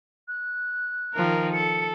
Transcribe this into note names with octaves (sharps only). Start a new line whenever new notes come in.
F#6
D#3 F3 A#4
A4 C#7